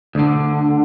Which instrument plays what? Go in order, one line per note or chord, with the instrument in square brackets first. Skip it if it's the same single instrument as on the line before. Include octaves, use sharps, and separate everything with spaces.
[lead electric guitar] D2 D3